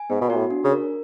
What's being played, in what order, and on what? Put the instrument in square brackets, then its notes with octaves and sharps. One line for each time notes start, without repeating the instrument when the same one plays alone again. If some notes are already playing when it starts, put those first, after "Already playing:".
Already playing: [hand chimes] G#5
[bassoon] G#2 [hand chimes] B3
[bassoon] B2
[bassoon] A#2 [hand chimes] F#4
[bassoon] A2
[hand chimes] D4
[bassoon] C#3
[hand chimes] A#4